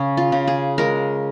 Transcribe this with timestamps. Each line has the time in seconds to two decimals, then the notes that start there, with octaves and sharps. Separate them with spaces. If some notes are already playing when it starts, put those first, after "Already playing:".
Already playing: C#3 C#4 G#4
0.17 F4
0.32 C#3
0.48 G#4
0.78 G#3 A#4